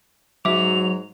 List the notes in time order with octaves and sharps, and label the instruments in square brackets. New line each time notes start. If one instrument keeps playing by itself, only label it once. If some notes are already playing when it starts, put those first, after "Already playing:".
[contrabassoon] G#2 [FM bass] F#3 [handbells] E5 D6 [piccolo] F7